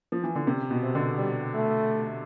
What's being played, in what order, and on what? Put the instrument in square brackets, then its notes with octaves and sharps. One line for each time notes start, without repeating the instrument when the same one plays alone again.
[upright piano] F3
E3
D3
C3
B2
[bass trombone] C3
[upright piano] B2 D3
[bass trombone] G3
A3